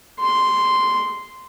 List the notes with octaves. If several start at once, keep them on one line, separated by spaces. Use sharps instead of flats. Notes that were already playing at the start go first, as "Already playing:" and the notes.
C6